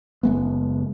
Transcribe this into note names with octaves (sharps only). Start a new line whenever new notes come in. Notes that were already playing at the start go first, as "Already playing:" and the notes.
F#1 G#3 B3